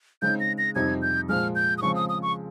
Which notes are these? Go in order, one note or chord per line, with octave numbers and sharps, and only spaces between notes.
C#3 G#3 C4 D#4 G6
A#6
A#6
F2 C3 G3 C4 D#4 G#6
G6
A#2 F3 G#3 F6
G6
D#6
C#3 F3 G#3 C4 C#6
D#6
D#6
C#6